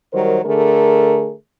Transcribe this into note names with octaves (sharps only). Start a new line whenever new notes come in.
D#3 F#3 G3 A#4 C5
D3 A3 G#4 A#4